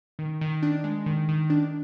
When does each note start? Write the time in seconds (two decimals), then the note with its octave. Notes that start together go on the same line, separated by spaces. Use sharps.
0.19 D#3
0.41 D#3
0.63 D4
0.84 G#3
1.06 D#3
1.28 D#3
1.50 D4